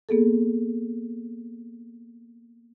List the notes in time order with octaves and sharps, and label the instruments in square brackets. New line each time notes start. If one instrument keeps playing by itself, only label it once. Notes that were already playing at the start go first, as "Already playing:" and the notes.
[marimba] A#3 B3 G#4 A4